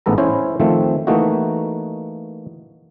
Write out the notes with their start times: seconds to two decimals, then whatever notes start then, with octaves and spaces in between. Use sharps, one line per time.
0.06 A1 G#2 B3 A4 A#5
0.18 C#4 E4 C5 C#5
0.60 D#3 F3 A3 C4
1.07 E3 A3 A#3 D#4 F#4